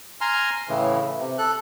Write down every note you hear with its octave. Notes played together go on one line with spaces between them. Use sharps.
G#5 A#5 C6 F6
A2 C#3 E3
C3
A4 F#6